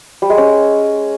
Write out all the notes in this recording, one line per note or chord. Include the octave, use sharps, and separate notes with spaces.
G3
G#3
C#4